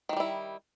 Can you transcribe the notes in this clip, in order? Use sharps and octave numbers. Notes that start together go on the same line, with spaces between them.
D#3 G3 A3 E4